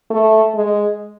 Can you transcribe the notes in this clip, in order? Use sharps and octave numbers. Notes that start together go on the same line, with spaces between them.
A3
G#3